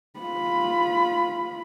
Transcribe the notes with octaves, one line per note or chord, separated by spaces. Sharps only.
F4 B5